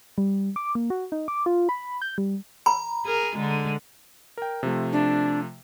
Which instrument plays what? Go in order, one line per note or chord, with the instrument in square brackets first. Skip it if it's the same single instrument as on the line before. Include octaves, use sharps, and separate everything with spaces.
[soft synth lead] G3
D6
A#3
F#4
D#4
D6
F4
B5
G6
G3
[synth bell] A#5 [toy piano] B5
[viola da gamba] G#4 A#4
D3 G#3
[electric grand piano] A#4 G5
C3 F3 A3
[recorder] D4